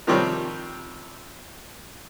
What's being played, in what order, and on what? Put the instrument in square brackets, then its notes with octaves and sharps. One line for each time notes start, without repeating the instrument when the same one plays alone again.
[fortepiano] C3 D#3 F3 G3 C4 C#5